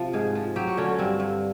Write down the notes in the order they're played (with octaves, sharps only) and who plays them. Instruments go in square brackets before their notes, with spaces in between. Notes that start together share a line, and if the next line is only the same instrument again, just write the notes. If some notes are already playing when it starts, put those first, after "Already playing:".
Already playing: [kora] C3 F3
G#2 G#4
F3
F#3 G4
F#4
D3 C#4
C#4
G2 C4
G2